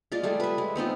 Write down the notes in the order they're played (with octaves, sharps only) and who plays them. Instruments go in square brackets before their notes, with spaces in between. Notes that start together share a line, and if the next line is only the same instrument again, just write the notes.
[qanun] G#3 F4 D5
G3 A3 G#4
B4 E5
G#3
B3 C4 D#4 F4